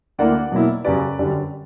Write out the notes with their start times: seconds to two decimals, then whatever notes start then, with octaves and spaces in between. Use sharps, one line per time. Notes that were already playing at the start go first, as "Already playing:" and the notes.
0.18 D2 D3 A#3 E4 D5 F#5
0.52 B2 F#3 A#3 E4
0.85 F#2 C#3 G3 B4 D5
1.19 F#2 D3 G3